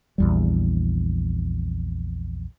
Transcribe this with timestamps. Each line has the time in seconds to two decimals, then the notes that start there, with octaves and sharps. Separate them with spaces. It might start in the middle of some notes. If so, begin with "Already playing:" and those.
0.18 A#1 E2 G3